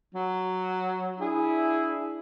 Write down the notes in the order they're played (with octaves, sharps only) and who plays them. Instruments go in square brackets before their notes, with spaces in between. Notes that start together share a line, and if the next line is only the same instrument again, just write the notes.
[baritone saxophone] F#3
[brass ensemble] D4 E4 [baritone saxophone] G#4